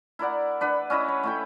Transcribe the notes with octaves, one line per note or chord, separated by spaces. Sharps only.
E4 A#4 D5 F#5
D4 B4 F#5
C#4 E4 D#5 B5
C#5
A3 E4 G5